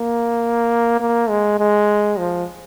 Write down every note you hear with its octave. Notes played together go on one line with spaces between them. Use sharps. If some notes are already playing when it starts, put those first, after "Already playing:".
Already playing: A#3
A#3
G#3
G#3
F3